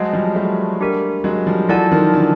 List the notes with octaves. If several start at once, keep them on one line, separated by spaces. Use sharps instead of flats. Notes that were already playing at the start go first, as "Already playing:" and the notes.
Already playing: F#3 G#3 G#4 C5 D#5 F#5 A5
F3 G3
G3 A3
D4 G4 A#4
F#3 G#3
F3 G3
E3 F#3 F4 A4 D5 F#5 A5
D#3 F3
D3 E3